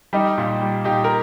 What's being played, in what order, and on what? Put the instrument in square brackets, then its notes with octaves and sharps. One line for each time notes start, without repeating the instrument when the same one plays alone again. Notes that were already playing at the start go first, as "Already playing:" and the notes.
[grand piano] G3 D#4 G4
A#2
G3
A#2 D#4 G4
A#4